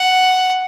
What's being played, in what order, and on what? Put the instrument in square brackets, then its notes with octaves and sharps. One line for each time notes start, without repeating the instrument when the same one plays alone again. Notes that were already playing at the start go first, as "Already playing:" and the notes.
Already playing: [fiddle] F#5